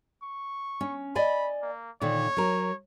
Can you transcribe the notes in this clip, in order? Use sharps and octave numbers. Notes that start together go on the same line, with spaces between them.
C#6
C#4
D5 D#5 G#5 B5
A#3
A#2 D3 D#3 C#5
F#3 A#4